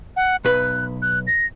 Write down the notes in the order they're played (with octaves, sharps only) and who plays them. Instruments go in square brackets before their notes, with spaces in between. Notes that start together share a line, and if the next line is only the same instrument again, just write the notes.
[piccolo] F#5
[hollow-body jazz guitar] B1 B4 [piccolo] F#6
[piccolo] F#6
A#6